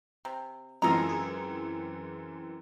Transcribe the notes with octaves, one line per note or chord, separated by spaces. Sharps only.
C3
F#2 E3 G#3 C4 F4 A4 D#5 A#5
G#4